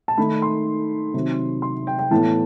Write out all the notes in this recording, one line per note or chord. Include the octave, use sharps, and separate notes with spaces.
A5
D#3 A3 D#4 B5
C6
C3 D#3 F#3
C6
G5
G5
A2 E3 B3 A5